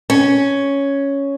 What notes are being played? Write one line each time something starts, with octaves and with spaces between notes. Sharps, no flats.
C#4